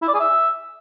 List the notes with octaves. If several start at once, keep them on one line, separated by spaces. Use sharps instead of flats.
E4
D5
G#4
E5